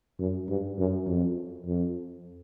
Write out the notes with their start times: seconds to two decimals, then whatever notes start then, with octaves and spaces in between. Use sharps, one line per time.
0.19 F#2
0.49 G2
0.78 F#2
1.07 F2
1.66 F2